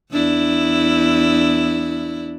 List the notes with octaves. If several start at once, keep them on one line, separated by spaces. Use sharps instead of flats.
E2 D4 E4